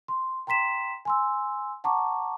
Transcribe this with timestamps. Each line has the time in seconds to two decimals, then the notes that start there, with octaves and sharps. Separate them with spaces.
0.08 C6
0.47 G5 A#5 C6 B6 E7
1.05 G#5 C6 E6
1.84 F#5 A5 A#5 C#6 D6